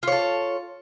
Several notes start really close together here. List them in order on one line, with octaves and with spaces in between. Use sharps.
F4 C#5 A4